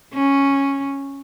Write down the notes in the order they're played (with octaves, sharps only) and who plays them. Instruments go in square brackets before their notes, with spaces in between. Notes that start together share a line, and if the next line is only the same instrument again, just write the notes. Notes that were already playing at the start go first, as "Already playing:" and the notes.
[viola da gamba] C#4